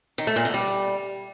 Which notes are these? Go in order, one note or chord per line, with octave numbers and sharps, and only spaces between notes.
D#3
A3
A#2
D3
G3